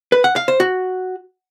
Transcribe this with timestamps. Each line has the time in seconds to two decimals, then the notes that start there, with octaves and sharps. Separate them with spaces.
0.12 B4
0.24 F#5
0.36 F5
0.48 C5
0.60 F#4